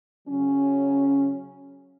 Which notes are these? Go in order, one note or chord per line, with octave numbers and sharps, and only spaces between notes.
C#3 F#3 C#4